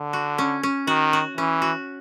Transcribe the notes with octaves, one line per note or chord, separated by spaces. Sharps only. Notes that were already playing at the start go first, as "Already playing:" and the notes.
Already playing: D3
F#4
C#4
C#4
D#3 F#4
F#4
E3 C#4
F#4